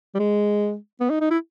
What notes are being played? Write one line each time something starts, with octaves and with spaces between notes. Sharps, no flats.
G3
G#3
B3
D#4
D#4
E4